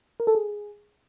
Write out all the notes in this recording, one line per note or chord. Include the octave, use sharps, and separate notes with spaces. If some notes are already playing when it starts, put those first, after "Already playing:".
A#4
A4
G#4